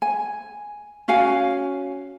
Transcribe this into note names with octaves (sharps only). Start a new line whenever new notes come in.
G#5
C#4 F#4 F5 G#5